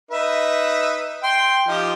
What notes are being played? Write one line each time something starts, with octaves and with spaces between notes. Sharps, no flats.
D#4 B4 E5
G5 C6
F3 D#4 G4